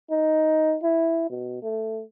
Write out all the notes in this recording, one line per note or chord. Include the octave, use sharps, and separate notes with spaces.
D#4
E4
B2
A3